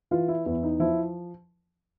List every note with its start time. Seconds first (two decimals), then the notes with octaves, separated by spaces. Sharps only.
0.11 E3 F4
0.28 E4
0.46 E2 E4
0.63 D#4
0.80 F3 E4